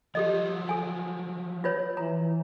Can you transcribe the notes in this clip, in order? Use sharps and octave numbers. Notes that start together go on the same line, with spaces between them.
F3 F#3 G4 A4 D#5
A4 G#5
F4 B4 C#5
E3 A#5